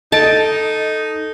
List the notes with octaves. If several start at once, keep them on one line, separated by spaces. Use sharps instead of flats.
D#4 A4 D#5 A5 D7